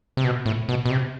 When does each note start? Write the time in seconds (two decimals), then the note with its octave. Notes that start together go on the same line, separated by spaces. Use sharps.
0.17 C3
0.25 B2
0.46 A2
0.69 B2
0.86 B2
0.91 C3